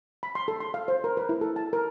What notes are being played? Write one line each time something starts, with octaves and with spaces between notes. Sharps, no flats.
B5
C6
A4
C6
F5
C5
A#4
B4
E4
A4
A5
A#4